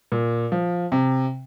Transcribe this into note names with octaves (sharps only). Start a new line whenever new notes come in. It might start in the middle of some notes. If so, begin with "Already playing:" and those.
A#2
F3
C3